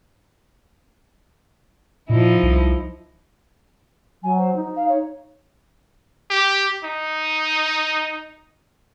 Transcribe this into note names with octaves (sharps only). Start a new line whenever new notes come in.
A#2 F3 D#4 E4
C2
F#3 G#5
C5
D#4
F5
C#5
G4
D#4